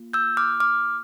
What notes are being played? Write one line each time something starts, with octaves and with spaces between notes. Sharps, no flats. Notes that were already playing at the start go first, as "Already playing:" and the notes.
Already playing: A#3 F4
E6 G6
D6 F6
D6 F6